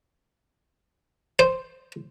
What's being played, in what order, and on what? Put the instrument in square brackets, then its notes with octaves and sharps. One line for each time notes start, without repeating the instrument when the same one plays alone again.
[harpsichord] C5